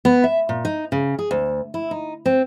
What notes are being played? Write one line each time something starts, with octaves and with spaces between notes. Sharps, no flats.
B3
E5
A#2
D#4
C#3
G#4
D2
E4
D#4
C4